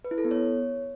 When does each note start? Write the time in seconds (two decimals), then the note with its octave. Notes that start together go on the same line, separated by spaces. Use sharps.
0.05 B4
0.11 E4
0.18 A4
0.25 B3
0.31 C#5